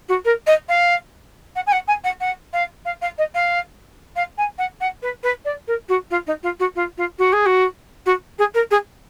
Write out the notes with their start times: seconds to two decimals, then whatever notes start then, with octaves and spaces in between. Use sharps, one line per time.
0.08 F#4
0.25 A#4
0.46 D#5
0.68 F5
1.55 F#5
1.66 G#5
1.72 F#5
1.87 G#5
2.04 F#5
2.20 F#5
2.53 F5
2.85 F5
3.01 F5
3.18 D#5
3.34 F5
4.16 F5
4.37 G#5
4.58 F#5
4.80 F#5
5.02 B4
5.23 B4
5.45 D5
5.67 A#4
5.88 F#4
6.10 F4
6.27 D#4
6.43 F4
6.59 F#4
6.75 F4
6.97 F4
7.18 F#4
7.32 G#4
7.46 F#4
8.06 F#4
8.38 G#4
8.54 A#4
8.71 G#4